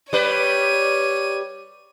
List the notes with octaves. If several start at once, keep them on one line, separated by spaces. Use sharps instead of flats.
G3 B4 C#5 D#7